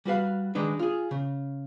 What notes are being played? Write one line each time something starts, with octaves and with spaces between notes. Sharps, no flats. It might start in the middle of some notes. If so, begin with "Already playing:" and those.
G3 F#4 B4 F5
D#3 G#3 D4 D#4 B4
F4 G#4
C#3